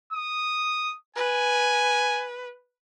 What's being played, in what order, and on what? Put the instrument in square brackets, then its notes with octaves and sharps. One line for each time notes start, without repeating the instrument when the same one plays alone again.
[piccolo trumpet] D#6
[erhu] B4 [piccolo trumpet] G#5